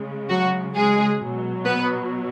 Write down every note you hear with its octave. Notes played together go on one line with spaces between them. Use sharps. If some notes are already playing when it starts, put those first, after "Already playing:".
Already playing: C#3 G#3
F#3 F#4
G#3 G#4
B2 F#3
B3 B4